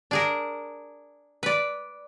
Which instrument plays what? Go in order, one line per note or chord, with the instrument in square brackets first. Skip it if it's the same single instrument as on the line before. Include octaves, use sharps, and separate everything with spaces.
[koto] D4 G#4 A#4
B4 D5